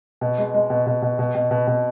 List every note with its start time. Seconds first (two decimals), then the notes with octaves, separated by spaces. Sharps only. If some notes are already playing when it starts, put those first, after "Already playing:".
0.21 B2
0.38 G#3
0.54 G#3
0.70 B2
0.86 B2
1.02 B2
1.19 B2
1.35 B2
1.51 B2
1.67 B2